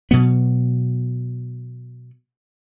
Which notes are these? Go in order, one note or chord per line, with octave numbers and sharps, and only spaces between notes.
B2 F#3 B3